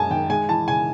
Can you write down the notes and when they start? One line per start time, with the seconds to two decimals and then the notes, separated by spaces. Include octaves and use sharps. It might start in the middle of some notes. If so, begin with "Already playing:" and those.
Already playing: F#2 G#3 G#5 A5
0.10 D#3 G5
0.30 G#3 G#5
0.49 E3 A5
0.68 C#3 G#5